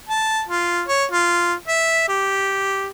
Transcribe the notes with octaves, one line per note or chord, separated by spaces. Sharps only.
A5
F4
C#5
F4
E5
G4